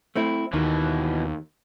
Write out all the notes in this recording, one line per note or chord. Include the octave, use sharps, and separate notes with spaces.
A3 C4 E4
D#2 B2 D#3 E3